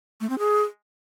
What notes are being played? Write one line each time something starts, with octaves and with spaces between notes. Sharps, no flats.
A3
C4
G#4